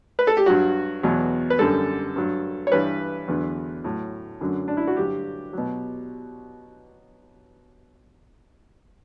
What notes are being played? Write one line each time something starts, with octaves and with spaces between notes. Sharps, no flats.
B4
A4
G4
G2 F#3 F#4
E2 B2 F#3
B4
F#2 D3 G3 A4
G2 F#3
C#5
G2 E3 G3 B4
E2 D3 F#3
A2 F#3
F#2 D3 F#3
D4
E4
F#4
G2 D3 F#3 G4
B2 F#3